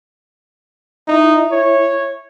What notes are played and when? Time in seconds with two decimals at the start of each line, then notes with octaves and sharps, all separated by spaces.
1.08 D#4 E4 E5
1.52 C#5